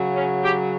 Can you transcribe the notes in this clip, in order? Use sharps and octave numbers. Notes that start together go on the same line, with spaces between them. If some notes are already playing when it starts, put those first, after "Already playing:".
Already playing: C#3 F#3
C#4
G4